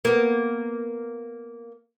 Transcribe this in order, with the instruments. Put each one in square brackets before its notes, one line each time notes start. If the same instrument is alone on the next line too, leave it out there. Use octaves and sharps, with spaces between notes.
[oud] A#3 B3